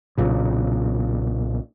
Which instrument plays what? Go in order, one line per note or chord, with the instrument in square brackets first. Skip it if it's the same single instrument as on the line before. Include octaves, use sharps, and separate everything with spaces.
[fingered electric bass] B1 A#2 C#3